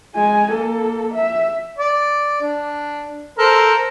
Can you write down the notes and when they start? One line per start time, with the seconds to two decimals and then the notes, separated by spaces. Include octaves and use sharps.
0.15 G#3 G#5
0.51 A#3 A4
1.14 E5
1.78 D5
2.42 D4
3.38 A4 A#4 C5